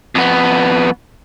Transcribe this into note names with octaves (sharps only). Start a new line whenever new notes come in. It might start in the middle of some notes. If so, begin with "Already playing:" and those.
F2 B3